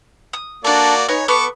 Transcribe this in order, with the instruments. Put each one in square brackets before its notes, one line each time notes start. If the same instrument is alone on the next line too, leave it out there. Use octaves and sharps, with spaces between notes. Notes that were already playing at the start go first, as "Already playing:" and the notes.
[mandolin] D#6
[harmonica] A#3 F#4 D5 [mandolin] D4 A4
[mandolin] B3 D#4 G#5 [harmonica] C#5
[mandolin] B3 [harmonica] A4 C#6 D6